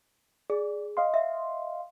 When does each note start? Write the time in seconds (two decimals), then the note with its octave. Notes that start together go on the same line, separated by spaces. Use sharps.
0.50 G#4 D5
0.97 D#5 F5 C6
1.14 E5